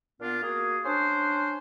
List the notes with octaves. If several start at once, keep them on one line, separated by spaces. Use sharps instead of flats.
A#2 B3 D4 F4
A#3 F#4 G#4
C#4 D4 C5